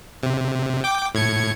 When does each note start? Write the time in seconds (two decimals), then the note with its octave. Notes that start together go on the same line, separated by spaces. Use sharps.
0.23 C3
0.84 G5 D6
1.15 A2 G#6 C#7